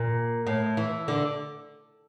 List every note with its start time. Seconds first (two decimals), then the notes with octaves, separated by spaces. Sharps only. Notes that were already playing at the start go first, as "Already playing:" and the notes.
Already playing: A#2
0.47 A2
0.77 E3
1.08 D3